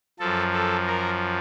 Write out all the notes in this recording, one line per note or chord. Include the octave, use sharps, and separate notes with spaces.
F#2 F3 A4
A4
A#4